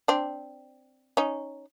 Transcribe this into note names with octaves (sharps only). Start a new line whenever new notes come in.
C4 D4
C#4 D#4